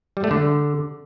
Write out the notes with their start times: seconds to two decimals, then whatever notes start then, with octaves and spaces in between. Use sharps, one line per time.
0.17 G3
0.24 A3
0.31 D3